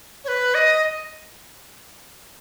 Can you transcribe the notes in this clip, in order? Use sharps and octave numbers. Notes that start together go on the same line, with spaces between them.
C#5
B4
D#5